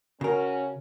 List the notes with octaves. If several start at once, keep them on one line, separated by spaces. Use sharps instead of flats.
C#3 C#4 F#4 A#4